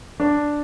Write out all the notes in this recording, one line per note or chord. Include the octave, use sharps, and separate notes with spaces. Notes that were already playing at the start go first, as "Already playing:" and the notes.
D4